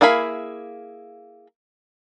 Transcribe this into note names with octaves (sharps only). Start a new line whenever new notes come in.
A#3 E4 G#4 F5 B5